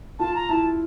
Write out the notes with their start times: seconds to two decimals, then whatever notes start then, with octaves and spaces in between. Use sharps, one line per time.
0.19 F4 A5
0.35 A#5
0.49 E4 A5